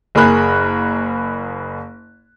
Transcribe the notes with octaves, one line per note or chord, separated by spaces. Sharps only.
F#1 G#4 A#4 B5 F#6